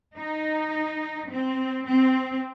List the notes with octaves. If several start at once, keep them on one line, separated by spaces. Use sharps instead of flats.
D#4
C4
C4